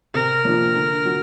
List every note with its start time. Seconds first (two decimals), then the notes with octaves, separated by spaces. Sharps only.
0.14 C3 A#4
0.45 F3 A#3 D4 F4
0.75 D3
1.05 F#3